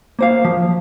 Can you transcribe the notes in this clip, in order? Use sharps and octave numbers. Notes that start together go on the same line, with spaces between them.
A#3 C5 F5
F3